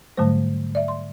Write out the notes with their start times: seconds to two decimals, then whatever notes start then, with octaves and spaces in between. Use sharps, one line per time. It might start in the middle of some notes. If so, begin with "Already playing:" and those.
0.17 G#2 D3 F#3 G3 A3 C5
0.75 D5 E5
0.88 C6